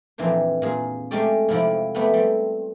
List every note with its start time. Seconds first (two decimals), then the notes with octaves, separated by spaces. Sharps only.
0.18 F2 A#2 E3 D4 C5
0.62 A#2 G#4
1.11 G#3 A3 C#4 G4 A4 D5
1.49 F2 C3 F3 E4 D5
1.95 A3 B3 G4 A4 B4
2.14 G3 C4